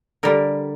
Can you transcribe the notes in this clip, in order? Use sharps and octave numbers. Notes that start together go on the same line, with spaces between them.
D3 G3 A#4